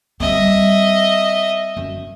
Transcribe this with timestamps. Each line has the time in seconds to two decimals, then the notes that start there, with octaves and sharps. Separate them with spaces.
0.20 G3 C4 D#5 E5
1.77 F#2